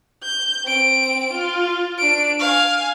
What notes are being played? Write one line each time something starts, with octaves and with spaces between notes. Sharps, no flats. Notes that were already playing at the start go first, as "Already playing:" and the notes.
G6
C4 D7
F4
D4 D7
F5 G#5